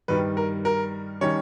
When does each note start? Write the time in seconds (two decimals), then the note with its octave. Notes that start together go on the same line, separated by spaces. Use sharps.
0.08 G2 D#3 G3 B4
0.37 A#4
0.65 A#4
1.21 D#3 G3 C#4 C#5